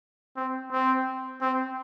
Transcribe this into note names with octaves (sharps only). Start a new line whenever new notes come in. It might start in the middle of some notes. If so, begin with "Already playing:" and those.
C4
C4
C4